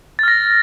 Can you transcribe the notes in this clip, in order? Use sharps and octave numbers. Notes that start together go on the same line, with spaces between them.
F6 A6 A#6